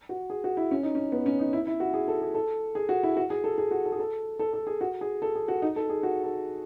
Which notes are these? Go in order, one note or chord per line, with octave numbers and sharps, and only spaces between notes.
F#4
G#4
F#4
E4
C#4
D#4
C#4
B3
C#4
D#4
E4
E4
F#4
G#4
A4
G#4
A4
G#4
F#4
E4
F#4
G#4
A4
G#4
F#4
A4
G#4
A4
A4
A4
G#4
F#4
G#4
A4
G#4
F#4
D#4
A4
G#4
F#4
A4